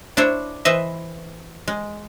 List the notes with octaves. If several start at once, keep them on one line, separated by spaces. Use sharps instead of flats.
D4 E4 C5 C#5
E3 B4 C5 D#5 E5
G#3